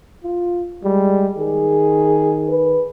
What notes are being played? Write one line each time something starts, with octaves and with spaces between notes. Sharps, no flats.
F4
G3 G#3
D#3 G#4
B4